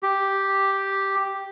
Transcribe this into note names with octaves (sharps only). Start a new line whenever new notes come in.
G4